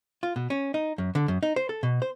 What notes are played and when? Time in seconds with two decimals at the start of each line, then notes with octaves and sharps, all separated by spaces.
0.23 F4
0.36 B2
0.50 C#4
0.74 D#4
0.98 F#2
1.15 D3
1.28 F#2
1.43 D#4
1.56 C5
1.69 A4
1.83 B2
2.02 C5